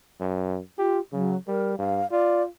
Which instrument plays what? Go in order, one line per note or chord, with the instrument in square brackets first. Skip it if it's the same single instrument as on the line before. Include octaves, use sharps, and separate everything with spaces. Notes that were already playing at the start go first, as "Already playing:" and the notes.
[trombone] F#2
[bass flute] F4 [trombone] G4
[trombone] C#3 [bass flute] F#3
[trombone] G3 [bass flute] A#4
[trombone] G2 [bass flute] F5
[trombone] F4 [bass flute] D5